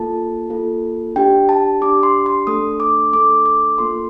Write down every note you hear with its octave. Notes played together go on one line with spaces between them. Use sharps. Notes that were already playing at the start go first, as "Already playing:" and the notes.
Already playing: A#3 F4 A4 A5
A#3 F4 A4
D4 G4 G5
A5
D4 G4 D6
C6
C6
A3 D4 A4 D#6
D6
A3 D4 A4 D6
D6
A#3 F4 A4 C6